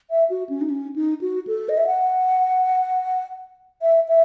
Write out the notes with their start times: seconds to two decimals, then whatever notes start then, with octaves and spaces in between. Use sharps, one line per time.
0.11 E5
0.30 F#4
0.49 C#4
0.61 D#4
0.70 C#4
0.96 D#4
1.21 F#4
1.47 A4
1.69 D#5
1.77 E5
1.87 F#5
3.82 E5
4.08 E5